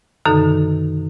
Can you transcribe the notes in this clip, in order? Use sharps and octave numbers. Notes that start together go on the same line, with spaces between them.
F#2 B2 D3 D#3 D#4 A4